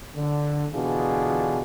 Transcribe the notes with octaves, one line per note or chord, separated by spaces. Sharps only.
D3
B2 D3 E3 D4 F4 G#4